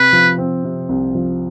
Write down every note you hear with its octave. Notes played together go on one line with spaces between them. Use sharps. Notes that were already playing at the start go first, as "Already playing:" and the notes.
Already playing: C3 B4
F3
C4
C3
C2
F3